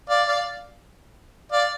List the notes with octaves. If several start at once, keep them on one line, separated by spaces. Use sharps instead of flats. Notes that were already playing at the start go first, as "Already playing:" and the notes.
D5 F5
D5 F5
D5 F5